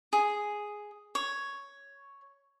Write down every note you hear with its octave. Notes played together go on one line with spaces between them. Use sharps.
G#4
C#5